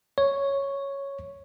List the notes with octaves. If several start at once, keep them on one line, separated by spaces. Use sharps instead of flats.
C#5